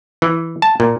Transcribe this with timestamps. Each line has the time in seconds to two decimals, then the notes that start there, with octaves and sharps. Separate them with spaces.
0.22 E3
0.62 A5
0.80 A#2